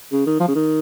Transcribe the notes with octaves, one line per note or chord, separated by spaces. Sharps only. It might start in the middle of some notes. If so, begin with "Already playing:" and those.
C#3
D#3
F3
C#3
D#3